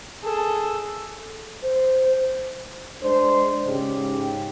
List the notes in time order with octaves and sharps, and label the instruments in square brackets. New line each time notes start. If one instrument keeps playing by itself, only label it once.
[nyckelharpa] G#4 A4
[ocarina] C5
[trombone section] G#3 D4 C5
G#2 C#3 G4